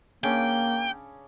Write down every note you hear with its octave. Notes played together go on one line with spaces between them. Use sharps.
C#3 A#3 C#4 D4 G5